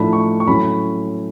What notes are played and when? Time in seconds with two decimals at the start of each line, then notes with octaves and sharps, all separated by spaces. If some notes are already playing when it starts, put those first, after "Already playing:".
Already playing: A2 F3 A3 D4 B5
0.13 C#6
0.40 C#6
0.47 A2 F#3 C#4 B5